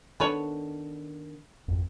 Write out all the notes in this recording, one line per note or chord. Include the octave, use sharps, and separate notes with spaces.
D#3 B3 D4 A4 B4 C#5
G#1 F2